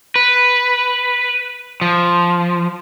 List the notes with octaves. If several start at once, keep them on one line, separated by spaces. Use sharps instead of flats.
B4
F3